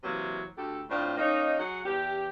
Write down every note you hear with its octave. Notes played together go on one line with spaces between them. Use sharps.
C3 E3 F#3 A#3 C5
D2 G4 A4
A2 C4 D4 F4 C5
A#3 C#4 D#4
F#3 G#4 F#5
E2 G4